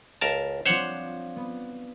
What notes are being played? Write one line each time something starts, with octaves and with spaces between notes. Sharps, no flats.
C#2 A#4 A5
F3 C4 D4 C5 C#5 F#5
B3